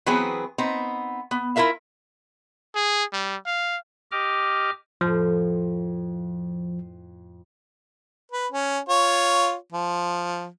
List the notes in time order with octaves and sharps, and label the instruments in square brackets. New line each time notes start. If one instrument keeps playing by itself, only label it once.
[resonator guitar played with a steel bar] E3 F#3 B3 C4 G#4 B4
B3 C4 D#4
B3
E4 F4 A#4 E5 F5
[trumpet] G#4
G3
F5
[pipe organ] G4 D#5 D6 F6
[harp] F2 A2 [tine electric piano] F3
[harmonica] B4
C#4
F4 C#5
F3